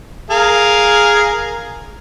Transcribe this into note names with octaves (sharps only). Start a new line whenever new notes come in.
G#4 A#4 F5